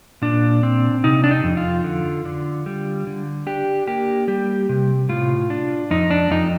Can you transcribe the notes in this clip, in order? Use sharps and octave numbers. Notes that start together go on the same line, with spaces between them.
A#2 D4
C4
C3 D#4
D4
D#4
F2
F4
D3
D3
G3
D3
D4 G4
A#3 G4
G3 G4
C3
A2 F4
D4
F2 D#4
D4
F2 D#4